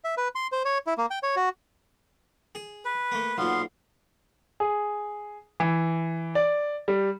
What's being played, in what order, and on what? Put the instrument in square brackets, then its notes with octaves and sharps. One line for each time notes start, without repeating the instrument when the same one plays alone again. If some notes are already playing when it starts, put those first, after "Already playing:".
[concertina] E5
B4
C6
C5
C#5
E4
A#3
G5
C#5
F#4
[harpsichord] G#4
[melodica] B4
[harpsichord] A3 A#3
[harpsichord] B1 A#2 [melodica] B3 F5 C6
[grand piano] G#4
E3
D5
G3